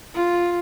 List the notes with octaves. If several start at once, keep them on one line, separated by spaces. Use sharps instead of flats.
F4